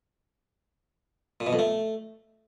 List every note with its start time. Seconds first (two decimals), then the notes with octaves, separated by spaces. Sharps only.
1.40 A#2
1.47 B2
1.53 F2
1.59 A3